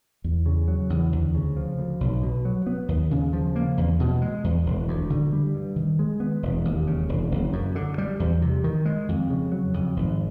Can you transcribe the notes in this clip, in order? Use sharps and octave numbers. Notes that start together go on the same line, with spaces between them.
E2
C#3
F#3
E2
D2
C#3
F3
D2
B1
B2
F#3
B3
D#2
C#3
F3
A#3
E2
B2
G#3
E2
E1
D2
D3
G3
G2
D#3
G#3
B3
E1
D#2
C#3
E1
F#1
F#2
D3
G3
E2
C3
D#3
G#3
F2
C#3
F#3
F2
G#1